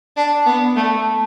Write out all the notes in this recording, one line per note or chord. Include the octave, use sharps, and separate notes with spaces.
D4
B3
A3